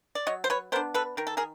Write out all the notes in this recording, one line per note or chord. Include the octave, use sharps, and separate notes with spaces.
D5
F#3 C#5 D#5
C5
B4 C#5
B3 D4 A#4 C5
A4 B4
D#3 A#4
A4
G#4 A#4